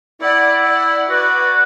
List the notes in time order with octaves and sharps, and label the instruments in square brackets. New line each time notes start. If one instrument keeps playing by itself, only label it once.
[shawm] E4 [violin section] D5 F#5
[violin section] D5 F#5
[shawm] F#4 [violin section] B4 D5